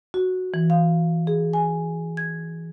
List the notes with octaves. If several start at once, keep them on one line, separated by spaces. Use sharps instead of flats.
F#4
E3
F5
G#4
G#5
G#6